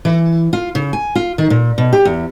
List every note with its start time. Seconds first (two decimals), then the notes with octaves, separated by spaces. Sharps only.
0.05 E3
0.53 F4
0.75 C#3
0.93 G#5
1.15 F4
1.38 D#3
1.50 A#2
1.78 B2
1.93 G4
2.05 E2